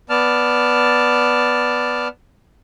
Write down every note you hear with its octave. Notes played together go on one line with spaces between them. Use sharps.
B3 D5 A5 F6